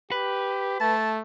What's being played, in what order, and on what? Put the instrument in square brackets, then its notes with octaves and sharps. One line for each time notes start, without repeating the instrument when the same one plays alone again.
[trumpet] G4 [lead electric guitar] B4
[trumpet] A3 [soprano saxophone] A5